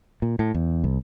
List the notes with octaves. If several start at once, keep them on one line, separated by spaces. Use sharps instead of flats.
A#2
A2
E2
C2